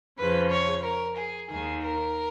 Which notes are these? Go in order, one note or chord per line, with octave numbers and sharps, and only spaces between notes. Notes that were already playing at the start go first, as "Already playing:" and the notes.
F2 C#3 F3 B4
C#5
A#4
G#4
D#2 D#3 G#4
A#4